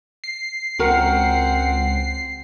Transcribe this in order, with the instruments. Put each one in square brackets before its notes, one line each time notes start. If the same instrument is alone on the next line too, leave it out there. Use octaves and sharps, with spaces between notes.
[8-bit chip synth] C7
[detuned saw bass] C#2 [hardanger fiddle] C4 F#5 [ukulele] F#4 A#4 A#5